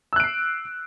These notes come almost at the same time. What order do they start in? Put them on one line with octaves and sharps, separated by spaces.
E6 F#6 D7 C7